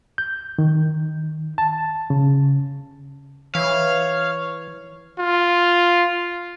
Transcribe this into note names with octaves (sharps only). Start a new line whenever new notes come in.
G6
D#3
A5
C#3
E3 C#5 F5
F4